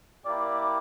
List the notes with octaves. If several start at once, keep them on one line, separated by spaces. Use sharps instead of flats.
A#3 E4 G4 D5